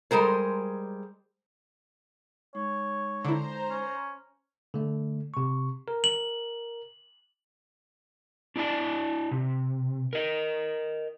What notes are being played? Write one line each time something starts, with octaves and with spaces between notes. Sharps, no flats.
G3 G#3 A#4 C5
G#3 D#4 C#5
D3 E4 C5 A#5
C#4
D3 A3
C3 C#6
A#4
F#7
D4 E4 D5 A5
C3
A#4 D#5